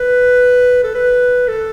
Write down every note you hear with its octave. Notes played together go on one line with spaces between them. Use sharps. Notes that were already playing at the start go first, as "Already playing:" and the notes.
Already playing: B4
A4
B4
A4